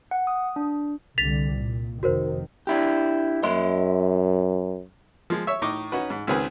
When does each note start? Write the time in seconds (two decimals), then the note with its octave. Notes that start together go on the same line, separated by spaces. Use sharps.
0.11 F#5
0.27 D#6
0.56 D4
1.18 C2 D3 G3 A6 B6 F7
1.59 A#2
2.03 F1 D#3 F#4 A#4 C5
2.67 D4 E4 G4
3.43 F#2 D#5 E5 C6
5.30 F3 G#3
5.47 C#5 E5
5.62 A2 D#4 D#5 C#6 D6
5.92 C#4 D#4 F#4 B4
6.10 G#2
6.27 C#2 D#3 C4 G#4 B4